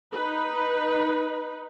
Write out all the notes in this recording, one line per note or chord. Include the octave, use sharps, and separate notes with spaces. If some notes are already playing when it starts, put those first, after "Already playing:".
D#4 B4